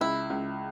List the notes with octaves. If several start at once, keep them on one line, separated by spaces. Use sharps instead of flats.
C#2 E4
C#2